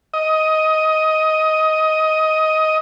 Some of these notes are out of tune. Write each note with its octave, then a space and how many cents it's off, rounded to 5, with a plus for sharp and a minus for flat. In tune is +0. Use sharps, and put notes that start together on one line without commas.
D#5 +10